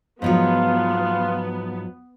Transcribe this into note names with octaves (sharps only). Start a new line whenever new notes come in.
G#2 F3 F#3 B3 F4